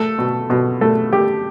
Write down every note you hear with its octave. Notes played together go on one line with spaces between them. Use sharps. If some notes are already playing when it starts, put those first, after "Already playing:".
Already playing: A3 A4
B2
B2
A3 A4
A3 G4